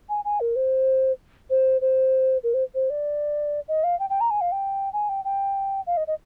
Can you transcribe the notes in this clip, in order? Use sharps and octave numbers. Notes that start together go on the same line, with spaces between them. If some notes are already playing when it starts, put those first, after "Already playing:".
G#5
G#5
A#4
C5
C5
C5
A#4
C5
C5
D5
D#5
F5
G5
G5
A#5
G#5
F5
G5
G#5
G5
G5
F5
D#5
D#5